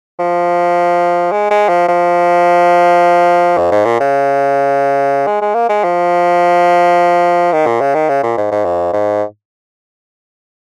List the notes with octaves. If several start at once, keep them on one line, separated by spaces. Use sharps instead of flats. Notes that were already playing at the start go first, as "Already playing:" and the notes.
F3
G#3
G#3
F3
F3
F2
G#2
A#2
C#3
G#3
G#3
A#3
G#3
F3
D#3
A#2
C#3
D#3
C#3
A#2
G#2
G#2
F2
G#2